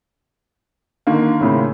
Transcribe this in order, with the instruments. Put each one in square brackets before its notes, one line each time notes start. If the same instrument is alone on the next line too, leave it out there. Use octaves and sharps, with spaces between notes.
[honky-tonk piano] D3 D#3 A#3
[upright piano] A2 C#3 C4